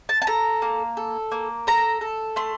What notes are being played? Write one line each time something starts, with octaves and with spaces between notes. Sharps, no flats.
A5
A5
A4 A#5
A#3
A4
A#3
A4 A#5
A4
A3 C6